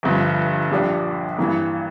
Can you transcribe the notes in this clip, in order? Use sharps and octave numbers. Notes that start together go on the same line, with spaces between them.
G1 G2 F3
A#1 A#2 G3 D4
G2 E3 A#3